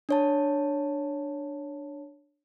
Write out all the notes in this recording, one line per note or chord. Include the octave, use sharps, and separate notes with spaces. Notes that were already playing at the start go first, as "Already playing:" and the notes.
D4 C#5 A5